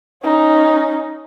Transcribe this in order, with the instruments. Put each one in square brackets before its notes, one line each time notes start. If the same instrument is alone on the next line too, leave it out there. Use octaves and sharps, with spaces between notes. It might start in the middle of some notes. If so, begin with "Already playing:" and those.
[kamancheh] C#4 D#4